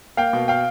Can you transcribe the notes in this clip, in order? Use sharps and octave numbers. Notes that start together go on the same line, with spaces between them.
A#3 F5 G5
B2
F5 G5